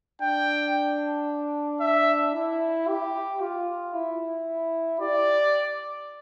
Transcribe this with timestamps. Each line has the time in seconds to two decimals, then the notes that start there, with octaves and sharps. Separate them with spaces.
0.21 D4 G5
1.81 E5
2.34 E4
2.88 G4
3.41 F4
3.94 E4
5.00 G4 D5